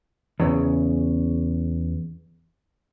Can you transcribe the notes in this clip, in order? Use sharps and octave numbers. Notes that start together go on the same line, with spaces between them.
E2 C#3